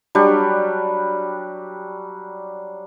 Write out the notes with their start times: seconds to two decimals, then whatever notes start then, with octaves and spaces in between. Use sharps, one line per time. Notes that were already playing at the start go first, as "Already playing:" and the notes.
0.15 F#3 G3 D4 G4